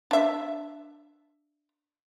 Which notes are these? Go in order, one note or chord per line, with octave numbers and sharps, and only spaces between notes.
D4 E5